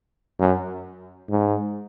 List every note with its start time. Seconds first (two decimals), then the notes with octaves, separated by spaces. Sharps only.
0.39 F#2
1.29 G#2